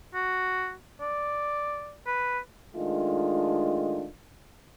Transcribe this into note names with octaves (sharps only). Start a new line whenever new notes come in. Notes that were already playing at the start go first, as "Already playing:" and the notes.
F#4
D5
B4
D#3 G#3 A3 D4 F4